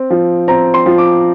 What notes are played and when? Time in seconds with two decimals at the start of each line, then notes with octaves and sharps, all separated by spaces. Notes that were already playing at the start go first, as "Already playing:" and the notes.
Already playing: C4
0.10 F3
0.48 C4 A#5
0.74 C6
0.86 F3
0.98 D6